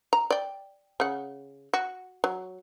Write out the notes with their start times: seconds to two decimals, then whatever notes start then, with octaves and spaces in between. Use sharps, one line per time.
0.13 A#5
0.30 D5 G5
1.00 C#3 F#5
1.74 F#4
2.24 F#3